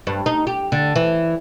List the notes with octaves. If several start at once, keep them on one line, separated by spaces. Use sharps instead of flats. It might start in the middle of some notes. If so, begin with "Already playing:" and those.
G2
D#4
G4
D3
E3